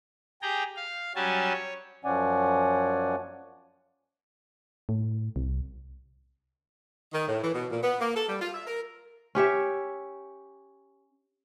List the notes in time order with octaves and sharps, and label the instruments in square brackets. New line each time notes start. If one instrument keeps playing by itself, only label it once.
[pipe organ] G4 G#4 G5 A#5
F5
F#3 G3 C#4 G#5 A5
C#5
[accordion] F#2 F3 C#4 D5 F#5 G#5
[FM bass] A2
C2
[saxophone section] D#3
A2
E3
B2
A#2
B3
A#3
A4
G3
F4
E5
A#4
[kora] C#4 G4 C#5 E5